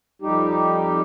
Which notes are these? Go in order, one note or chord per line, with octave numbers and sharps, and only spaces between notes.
F2 G3 D#4 G4